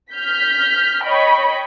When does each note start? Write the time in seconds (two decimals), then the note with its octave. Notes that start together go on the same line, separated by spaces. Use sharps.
0.12 F6 G6 B6
1.05 C#5 D#5 G5 B5